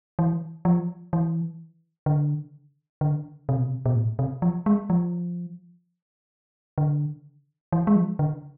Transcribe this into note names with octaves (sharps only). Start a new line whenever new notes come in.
E3
F3
E3
D3
D3
C3
B2
C3
B2
A2
C3
F3
G#3
F3
D3
E3
G#3
F3
D3